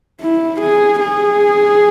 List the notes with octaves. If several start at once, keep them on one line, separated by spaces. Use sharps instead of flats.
E4
G#4
G#4